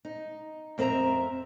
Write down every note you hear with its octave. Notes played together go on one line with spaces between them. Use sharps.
D#4
F2 C4 A#4 E5 A#5